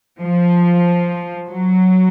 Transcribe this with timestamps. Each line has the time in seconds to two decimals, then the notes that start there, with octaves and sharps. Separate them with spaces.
0.19 F3
1.47 F#3